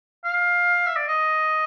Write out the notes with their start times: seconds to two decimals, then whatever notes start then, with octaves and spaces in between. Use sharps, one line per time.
0.25 F5
0.87 E5
0.96 D5
1.08 D#5